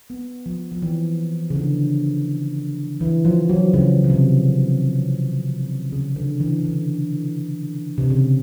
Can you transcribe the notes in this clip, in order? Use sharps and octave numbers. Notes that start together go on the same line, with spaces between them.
B3
F3
F3
E3
C#3
D3
E3
F3
F#3
C#3
C#3
C3
C#3
D3
E3
D3
C3
C#3